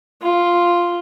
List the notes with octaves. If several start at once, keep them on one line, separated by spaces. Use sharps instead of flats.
F4